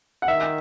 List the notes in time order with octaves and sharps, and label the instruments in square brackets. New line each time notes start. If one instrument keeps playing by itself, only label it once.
[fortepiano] F#5
[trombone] D#3 [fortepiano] E5